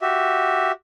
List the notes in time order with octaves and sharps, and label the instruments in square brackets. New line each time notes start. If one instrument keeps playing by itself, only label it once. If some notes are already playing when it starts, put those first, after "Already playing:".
[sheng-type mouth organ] F#4 G4 E5